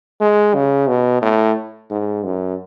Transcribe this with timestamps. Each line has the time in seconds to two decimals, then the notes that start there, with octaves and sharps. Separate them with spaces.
0.20 G#3
0.54 C#3
0.88 B2
1.22 A2
1.91 G#2
2.24 F#2